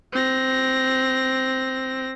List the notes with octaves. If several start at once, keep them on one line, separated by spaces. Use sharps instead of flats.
C4 A#6